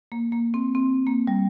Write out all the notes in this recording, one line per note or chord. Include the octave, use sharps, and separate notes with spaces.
A#3
A#3
C4
C4
A#3
G3